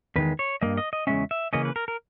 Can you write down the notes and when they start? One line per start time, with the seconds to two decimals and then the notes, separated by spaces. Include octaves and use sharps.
0.16 E2 D#3 G#3 B4
0.39 C#5
0.61 G2 G3 A#3 D#5
0.77 D#5
0.93 D#5
1.07 E2 C#3 G#3 C#4 E5
1.31 E5
1.53 C#3 E3 A#3 C#4 D#5
1.65 B4
1.76 A#4
1.88 A#4